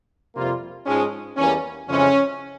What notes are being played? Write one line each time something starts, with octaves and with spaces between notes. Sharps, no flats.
F2 C3 G3 A#3 F4
G#2 F3 G#3 C#4
E2 E3 G3 A#3 C#4
F2 C#3 E3 G#3 C#4